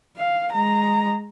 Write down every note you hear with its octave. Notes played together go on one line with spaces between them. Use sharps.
F5
G#3 A#5